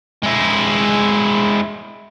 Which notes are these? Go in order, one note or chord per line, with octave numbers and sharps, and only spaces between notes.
G#3 E4